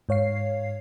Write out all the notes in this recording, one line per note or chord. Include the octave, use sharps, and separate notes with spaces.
G#2 C#5 F5 C7